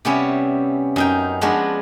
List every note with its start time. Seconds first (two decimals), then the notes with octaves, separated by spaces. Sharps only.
0.05 C3 G3 B3 C#4 E4
0.96 F#2 D#4 G5
1.41 F3 G#3 B3 D4 F4 F#4